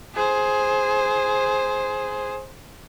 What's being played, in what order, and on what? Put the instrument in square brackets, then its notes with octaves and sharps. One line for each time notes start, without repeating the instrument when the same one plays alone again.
[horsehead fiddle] G#4 C5